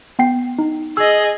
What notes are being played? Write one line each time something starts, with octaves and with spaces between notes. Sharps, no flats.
B3 G5 C7
D#4
G#4 D#5 E6